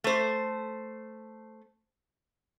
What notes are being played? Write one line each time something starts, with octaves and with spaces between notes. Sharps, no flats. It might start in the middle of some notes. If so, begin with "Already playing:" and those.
A3 C5